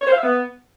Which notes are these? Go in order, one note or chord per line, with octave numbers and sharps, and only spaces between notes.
C#5
C5
F5
E5
B3